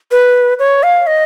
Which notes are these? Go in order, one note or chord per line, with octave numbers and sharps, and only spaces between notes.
B4
C#5
F5
D#5